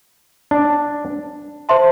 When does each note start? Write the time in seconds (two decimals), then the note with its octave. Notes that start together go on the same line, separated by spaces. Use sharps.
0.51 D4
1.69 C5 E5 A5 C6